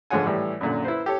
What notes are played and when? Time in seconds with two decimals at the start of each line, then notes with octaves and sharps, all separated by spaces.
0.10 G#2 D3 F3 C#5 F#5 G#5
0.25 A2 E3 G3
0.61 F#2 A#2 D3
0.85 E4 B4 C5
1.06 G4 A4 C#5